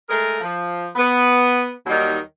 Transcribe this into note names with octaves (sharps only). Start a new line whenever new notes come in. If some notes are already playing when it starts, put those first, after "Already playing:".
G#3 A3 G#4 A#4
F3
B3
D#2 D#3 F#3 G3 D#4